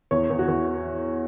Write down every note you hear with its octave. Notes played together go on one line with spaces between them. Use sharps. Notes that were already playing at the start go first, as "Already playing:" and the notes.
E2 C#5
E2
F#4
E2